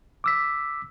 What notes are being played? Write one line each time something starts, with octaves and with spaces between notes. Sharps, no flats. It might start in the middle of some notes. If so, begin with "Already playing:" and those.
D6 E6 B6